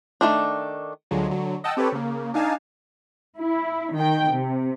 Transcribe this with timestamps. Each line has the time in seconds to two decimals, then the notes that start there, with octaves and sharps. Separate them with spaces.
0.21 D#3 G3 A3 D4
1.11 D2 D3 F3 F#3 G#3
1.29 D3 F#3
1.64 D#5 F#5 G5 A5 E6
1.77 C4 G4 A4 B4 C#5
1.92 C#3 A#3
2.34 D4 D#4 F5 G#5 A5
3.38 E4
3.95 D#3 G5
4.32 C3